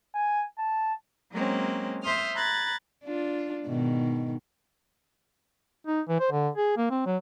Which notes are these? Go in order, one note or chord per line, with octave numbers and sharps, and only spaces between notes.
G#5
A5
F#3 G#3 A#3 C4 C#4
C5 E5 C6 D#6 F6
A#5 B5 F#6 G#6 A6
D4 F4
G#2 B2 D#3
D#4
E3
C5
D3
G#4
A#3
C4
F#3